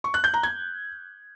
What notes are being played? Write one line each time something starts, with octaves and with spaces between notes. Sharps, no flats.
C#6
F#6
G6
A#5
G#6